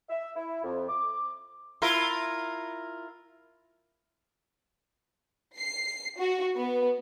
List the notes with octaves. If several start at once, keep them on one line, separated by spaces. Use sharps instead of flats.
E5
E4
F2
D6
E4 F4 A#4
C7
F#4
B3